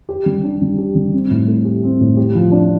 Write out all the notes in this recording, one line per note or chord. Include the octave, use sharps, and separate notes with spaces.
G4
G3
D4
G3
G4
G3
C4
A2
A3
G4
C4
A2
G4
F3
D4